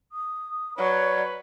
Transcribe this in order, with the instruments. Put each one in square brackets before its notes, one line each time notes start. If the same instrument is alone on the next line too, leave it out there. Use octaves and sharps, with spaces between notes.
[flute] D#6
[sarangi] F#3 [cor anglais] B4 [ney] C#5 [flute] D5